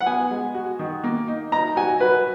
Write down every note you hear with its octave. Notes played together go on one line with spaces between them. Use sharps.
F#5
B3 G#5
G#3
F#4
D#3
A#3
D#4
D#4 A#5
F#4 G#5
F#4 B4